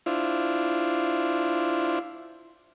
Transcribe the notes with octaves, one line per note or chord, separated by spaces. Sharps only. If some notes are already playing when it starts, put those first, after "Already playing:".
D4 E4 F4 C5